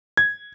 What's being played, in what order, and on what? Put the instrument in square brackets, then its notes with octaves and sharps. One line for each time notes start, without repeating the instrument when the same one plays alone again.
[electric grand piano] G#6